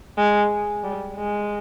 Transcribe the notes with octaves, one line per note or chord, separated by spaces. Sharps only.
G#3
G3
G#3